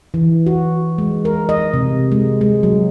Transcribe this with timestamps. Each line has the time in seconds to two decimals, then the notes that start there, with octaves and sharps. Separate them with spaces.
0.14 E3
0.46 F#4
0.98 G#3
1.25 A#4
1.49 D#5
1.74 C3
2.12 G#3
2.41 G#3
2.63 F#3